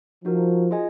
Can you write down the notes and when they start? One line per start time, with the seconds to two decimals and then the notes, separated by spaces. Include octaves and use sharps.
0.25 F3 D#4 F#4 A#4
0.71 F4 G#4 D#5 G#5